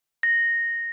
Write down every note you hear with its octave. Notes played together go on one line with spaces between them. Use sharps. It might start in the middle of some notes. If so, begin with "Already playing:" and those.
A#6